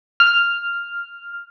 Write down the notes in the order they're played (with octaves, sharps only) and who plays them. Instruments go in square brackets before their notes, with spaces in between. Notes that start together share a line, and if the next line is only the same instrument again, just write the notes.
[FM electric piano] F6